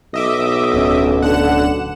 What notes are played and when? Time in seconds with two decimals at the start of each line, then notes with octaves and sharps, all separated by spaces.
0.14 B1 D#5 E5 D6
0.74 D1 C#4
1.22 D3 F#5 E7